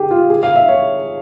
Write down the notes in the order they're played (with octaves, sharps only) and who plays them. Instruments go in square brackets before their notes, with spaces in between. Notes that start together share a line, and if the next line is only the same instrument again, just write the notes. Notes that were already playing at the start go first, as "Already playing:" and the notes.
Already playing: [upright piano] G4 G#4
F4
G#4
F5
E5
C#5